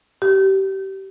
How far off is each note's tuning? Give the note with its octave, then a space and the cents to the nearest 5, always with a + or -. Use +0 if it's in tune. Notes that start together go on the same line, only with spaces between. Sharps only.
G4 -25